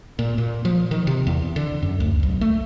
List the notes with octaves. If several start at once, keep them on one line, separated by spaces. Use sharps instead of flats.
A#2
A#2
F3
D#3
C3
E2
D3
F#2
D2
B1
A3